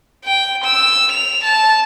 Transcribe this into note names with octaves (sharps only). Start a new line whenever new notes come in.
G5
E6
F7
A5